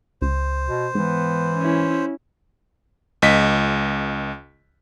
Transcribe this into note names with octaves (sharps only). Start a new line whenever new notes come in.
C#2 C5
B2
G#2 E3 B3
C#4 E4
C#2 D#5 B6